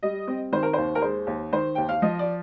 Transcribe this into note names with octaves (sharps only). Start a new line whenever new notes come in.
G3 D#5
C4
D#3 C5
A#4
D#2 C5
A#4
G#3 C5
D#2
D#3 C5
D#2 G5
F5
F3 D#5
D5